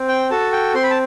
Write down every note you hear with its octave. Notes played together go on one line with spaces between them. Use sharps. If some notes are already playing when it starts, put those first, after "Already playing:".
Already playing: C4
G5
F#4 A4 A5
G5
C4 C6
B5
A5